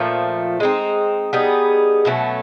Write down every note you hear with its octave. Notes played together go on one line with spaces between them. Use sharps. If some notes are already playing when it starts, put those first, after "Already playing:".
Already playing: A#2 F3 A3
G#3 C4 D#4
G3 B3 D#4 G#4
B2 F#3 A3 C#4